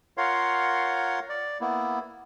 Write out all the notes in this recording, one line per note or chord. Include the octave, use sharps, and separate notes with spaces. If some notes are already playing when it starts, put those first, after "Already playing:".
F4 A#4 C#5 F5 F#5 C6
D5
A#3 B3 E4